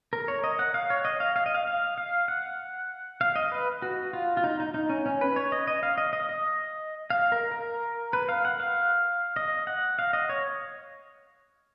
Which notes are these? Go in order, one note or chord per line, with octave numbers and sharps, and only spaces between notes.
A#4
C#5
D#5
F#5
F5
C#5
D#5
F5
F5
D#5
F5
F5
F5
F#5
F5
D#5
B4
F#4
F4
F4
D#4
D#4
D#4
C#4
C#4
B4
C#5
D#5
D#5
F5
D#5
D#5
D#5
F5
A#4
A#4
B4
F5
F#5
F5
D#5
F#5
F5
D#5
C#5